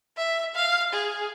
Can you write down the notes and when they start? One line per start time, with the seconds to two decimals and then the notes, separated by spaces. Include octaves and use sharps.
0.17 E5
0.55 F5
0.93 G#4